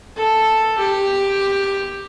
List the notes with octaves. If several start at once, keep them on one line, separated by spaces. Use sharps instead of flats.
A4
G4